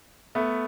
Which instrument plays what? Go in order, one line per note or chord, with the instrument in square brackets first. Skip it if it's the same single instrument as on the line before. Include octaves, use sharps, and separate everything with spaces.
[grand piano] A3 B3